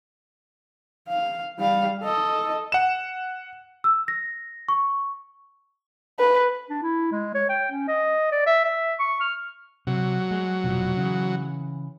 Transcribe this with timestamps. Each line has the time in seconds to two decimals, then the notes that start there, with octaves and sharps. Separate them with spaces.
1.09 F5
1.58 G3 F5
2.03 A4 D#5
2.72 F#5 E7
3.84 E6
4.08 A#6
4.69 C#6
6.19 B4
6.70 D4
6.82 E4
7.12 G#3
7.35 C#5
7.50 G5
7.71 C#4
7.88 D#5
8.32 D5
8.47 E5
8.64 E5
8.99 C#6
9.20 F6
9.87 C3 F#3
10.31 G#3
10.64 F1 B2 F3
10.97 C#3 E3